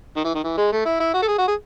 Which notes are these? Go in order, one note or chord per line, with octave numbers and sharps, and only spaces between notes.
D#3
E3
D#3
E3
G#3
A3
E4
E4
F#4
A4
G#4
F#4
G#4